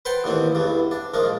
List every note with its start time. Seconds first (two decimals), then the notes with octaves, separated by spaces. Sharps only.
0.05 B4 C5 F#5 G5 A5 C6
0.24 D#2 A2 E3 C4
0.55 E2 G2 E3
0.91 D4
1.14 A#1 F3 G#3 A#3